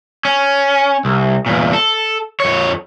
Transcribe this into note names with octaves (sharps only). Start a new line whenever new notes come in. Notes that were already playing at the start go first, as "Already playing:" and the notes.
C#4
C2
E2 A#2
A4
F2 C#5